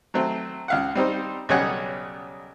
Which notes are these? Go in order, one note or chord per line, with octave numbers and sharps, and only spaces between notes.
F#3 A3 C4
C#2 F5 F#5
G3 C4 D#4 C5
B1 C#3 G3 C#5 F#5 G#5